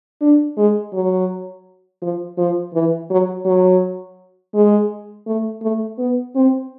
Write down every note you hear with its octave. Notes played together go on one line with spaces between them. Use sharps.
D4
G#3
F#3
F3
F3
E3
F#3
F#3
G#3
A3
A3
B3
C4